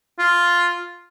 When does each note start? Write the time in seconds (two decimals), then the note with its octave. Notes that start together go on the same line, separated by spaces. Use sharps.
0.19 F4